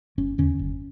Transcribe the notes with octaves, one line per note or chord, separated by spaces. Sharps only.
F#1 C#4
E2 D3 C#4
F#1